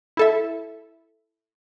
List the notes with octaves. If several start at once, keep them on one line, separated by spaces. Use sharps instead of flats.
E4 A4 E5